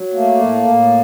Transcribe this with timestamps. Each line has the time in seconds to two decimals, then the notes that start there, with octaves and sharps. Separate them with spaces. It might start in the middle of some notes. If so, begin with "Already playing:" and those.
Already playing: F#3
0.13 A3 A#3
0.40 A2
0.67 A2